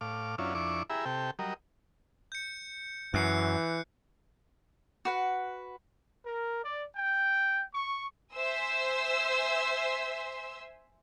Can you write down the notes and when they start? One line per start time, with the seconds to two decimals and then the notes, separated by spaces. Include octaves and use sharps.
0.01 A2 F5 D6
0.38 F#2 C#4 D4 E4 F4
0.55 F2 D4 E4 C#6 D6
0.90 E4 G4 G#4 E5 A#5 B5
1.05 C3 G4 A4 G5
1.39 F#3 G3 A#4 D#5
2.32 G6 C#7
3.14 F#2 E3 F#6 C7 C#7
5.05 F#4 B4 F#5
6.24 A#4
6.64 D5
6.96 G5
7.74 C#6
8.35 C5 E5 G#5 C6 E6